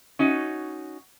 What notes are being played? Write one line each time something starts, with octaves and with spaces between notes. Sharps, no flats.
C#4 D#4 F#4